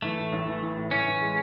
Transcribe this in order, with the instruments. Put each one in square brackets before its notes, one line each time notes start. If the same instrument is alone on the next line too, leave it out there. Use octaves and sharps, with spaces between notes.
[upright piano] E3 [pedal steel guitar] A3
[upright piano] A2
A1
E3
E3
A2
[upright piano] E3 [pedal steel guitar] C#4
[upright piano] E3
G#3